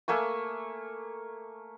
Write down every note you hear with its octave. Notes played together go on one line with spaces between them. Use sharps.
A3 A#3 G#5 C#6